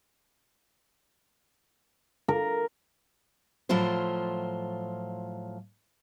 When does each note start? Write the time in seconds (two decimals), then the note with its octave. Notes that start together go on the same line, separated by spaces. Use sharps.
2.28 A#4
3.69 A2 F3 F#3 F4 C5